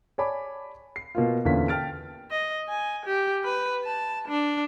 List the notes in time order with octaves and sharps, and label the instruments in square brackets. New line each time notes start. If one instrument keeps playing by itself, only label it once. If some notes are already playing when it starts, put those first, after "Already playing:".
[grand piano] C#5 D5 G#5 A5 B5 D6
C7
B2 A#3 F4
E2 A#2 D3 C#4 F5 B6
G5 A5 F6 A6 D7
[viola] D#5
G#5
G4
B4
A5
D4